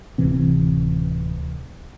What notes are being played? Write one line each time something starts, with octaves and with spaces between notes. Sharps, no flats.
D1 C3 E3 C4